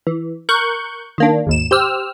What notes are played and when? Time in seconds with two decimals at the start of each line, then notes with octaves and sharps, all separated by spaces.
0.07 E3
0.49 A#4 C#6 F#6 G6
1.18 D#3 A#3 D4
1.47 G#1 D#2 E7
1.71 G4 C5 E6 F6